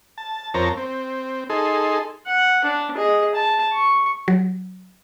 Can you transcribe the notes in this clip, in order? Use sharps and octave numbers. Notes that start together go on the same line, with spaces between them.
A5
F2 C4 A#4 C#5 A5 A#5
C4
D#4 G#4 A4 C6
F#5
D4
G#4 D#5
A5
C#6
F#3